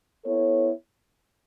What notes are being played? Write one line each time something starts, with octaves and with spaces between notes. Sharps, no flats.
B3 E4 A4 C#5